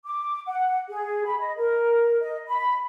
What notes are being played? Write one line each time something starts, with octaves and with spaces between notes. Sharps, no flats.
D6
F#5
G#4
B5
D#5
A#4
D#5
B5